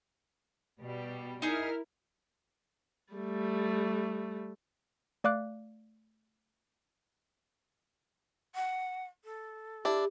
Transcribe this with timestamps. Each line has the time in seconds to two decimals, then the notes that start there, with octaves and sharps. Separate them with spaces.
0.80 B2 G3
1.42 D#4 E4 G#4 A#4 F6
3.13 G3 A3
5.24 A3 D5 F5 D6 F#6
8.55 F#5
9.24 A4
9.85 D4 E4 G4